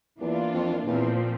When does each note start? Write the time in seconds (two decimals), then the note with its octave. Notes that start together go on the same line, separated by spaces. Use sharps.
0.20 E2 E3 A#3 D4 F4
0.54 F2
0.87 E2 A#2 F3 C4